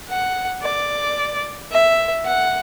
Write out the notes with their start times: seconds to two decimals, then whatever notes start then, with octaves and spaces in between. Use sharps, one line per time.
0.08 F#5
0.63 D5
1.72 E5
2.26 F#5